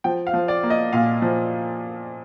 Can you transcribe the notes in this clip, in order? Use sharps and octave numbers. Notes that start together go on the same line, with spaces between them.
F3 G5
F5
F3
D5
A#3
D#5
A#2 F5
F3